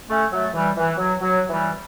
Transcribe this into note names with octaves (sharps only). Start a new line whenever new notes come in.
A3 C#4
F#3 A3
E3 G3
E3
F#3
F#3
E3 G3